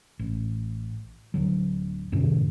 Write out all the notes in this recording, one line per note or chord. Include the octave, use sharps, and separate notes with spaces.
A1
D1 G1 D3 F#3
F#2 A2 C3 D#3